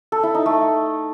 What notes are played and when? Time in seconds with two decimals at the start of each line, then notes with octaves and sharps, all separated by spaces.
0.12 A4
0.23 E4
0.35 D#4
0.46 A3